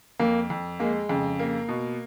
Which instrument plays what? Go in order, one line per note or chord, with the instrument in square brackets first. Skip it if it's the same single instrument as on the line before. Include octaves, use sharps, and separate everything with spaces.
[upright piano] F2 [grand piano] A#3
[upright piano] F2
[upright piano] G#3 [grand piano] A#3
[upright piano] F2 [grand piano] C#3
[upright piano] A#3
B2